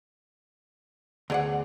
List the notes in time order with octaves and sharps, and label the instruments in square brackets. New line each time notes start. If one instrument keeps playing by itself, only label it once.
[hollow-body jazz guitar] D2 G#4 D5 [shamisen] B3 C5 F#5